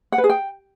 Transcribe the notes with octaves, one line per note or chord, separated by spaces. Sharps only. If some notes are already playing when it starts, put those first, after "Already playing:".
F#5
B4
G#4
G5